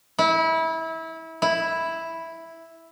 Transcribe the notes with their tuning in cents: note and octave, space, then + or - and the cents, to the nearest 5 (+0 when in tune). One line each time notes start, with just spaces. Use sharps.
E4 -25
E4 +0